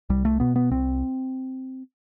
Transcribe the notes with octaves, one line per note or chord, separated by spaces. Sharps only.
C2 G3
A3
B2 B3
B3
C2 C4